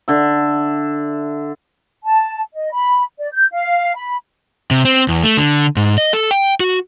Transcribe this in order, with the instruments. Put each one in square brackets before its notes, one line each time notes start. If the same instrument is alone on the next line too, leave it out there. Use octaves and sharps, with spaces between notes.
[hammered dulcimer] D3 E5
[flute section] A5
D#5
B5
D5
G6
F5
B5
[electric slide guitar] C3
C4
E2
A3
D3
G#2
D#5
A4
G5
F#4